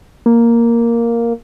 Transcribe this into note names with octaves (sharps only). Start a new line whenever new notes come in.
A#3